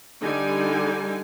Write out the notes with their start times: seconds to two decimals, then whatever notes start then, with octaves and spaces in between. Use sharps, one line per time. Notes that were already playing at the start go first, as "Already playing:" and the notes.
0.21 D3 G3 D#4 G#5